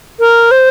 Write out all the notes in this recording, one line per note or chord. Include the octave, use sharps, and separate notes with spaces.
A#4
C5